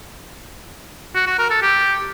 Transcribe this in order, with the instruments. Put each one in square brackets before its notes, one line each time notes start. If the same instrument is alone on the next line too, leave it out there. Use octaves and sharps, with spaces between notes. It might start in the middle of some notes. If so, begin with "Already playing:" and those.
[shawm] F#4
F#4
A#4
A4
G4